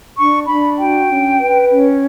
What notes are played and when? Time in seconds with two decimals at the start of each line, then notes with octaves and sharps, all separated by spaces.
0.18 D4 C#6
0.48 D4 B5
0.79 F#4 G5
1.09 C#4
1.40 B4
1.70 C#4